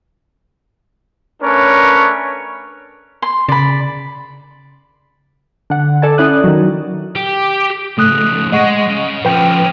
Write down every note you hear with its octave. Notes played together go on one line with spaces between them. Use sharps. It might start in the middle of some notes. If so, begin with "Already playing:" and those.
A3 C#4 D4 A#4 B4 C#5
C6
C#3 D5 B5
D3 F#5
A4 D5 G#5 A5
C#4 E4 D5 D#6 F#6
D#3 F#3
G4
C#2 G#2 A3 D#6 F#6
G#3 D#5 F#5 C#6
C#3
F3 C#4 B4 G5